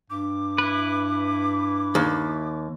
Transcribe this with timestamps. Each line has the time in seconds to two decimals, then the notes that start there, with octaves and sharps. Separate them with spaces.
0.10 G2 D6
0.58 E4 B4
1.95 D#2